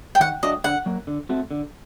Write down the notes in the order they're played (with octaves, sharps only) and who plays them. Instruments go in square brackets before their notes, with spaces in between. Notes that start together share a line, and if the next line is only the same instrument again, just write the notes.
[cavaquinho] G5
[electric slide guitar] D#3 [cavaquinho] F#5
[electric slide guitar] F#3 A3 D4 F#4 [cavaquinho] D#5
[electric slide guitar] D3 [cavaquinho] F#5
[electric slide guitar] F#3 A#3
D3
A3 C4 F#4
D3